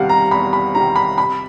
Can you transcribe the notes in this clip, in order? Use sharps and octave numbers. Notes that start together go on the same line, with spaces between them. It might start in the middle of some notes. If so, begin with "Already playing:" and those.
Already playing: E2 C3 D#3 G3 F5 F#5
A#5
E2 B5
B5
C3 D#3 G3 A#5
B5
C3 B5